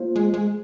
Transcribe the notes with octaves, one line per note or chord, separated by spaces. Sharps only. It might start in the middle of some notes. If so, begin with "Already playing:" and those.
Already playing: A#3 F4 C5
G#3
G#3